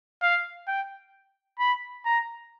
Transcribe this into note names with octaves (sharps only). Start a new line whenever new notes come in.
F5
G5
B5
A#5